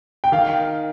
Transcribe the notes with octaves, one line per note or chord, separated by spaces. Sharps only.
G5
D#3 F5